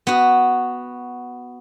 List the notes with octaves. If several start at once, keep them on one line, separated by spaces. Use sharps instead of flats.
B3 F#4